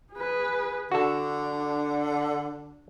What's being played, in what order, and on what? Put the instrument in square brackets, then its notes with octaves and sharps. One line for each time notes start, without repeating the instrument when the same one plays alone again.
[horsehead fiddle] G#4 B4
[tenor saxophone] D3 [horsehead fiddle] D4 [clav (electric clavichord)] F#4 A4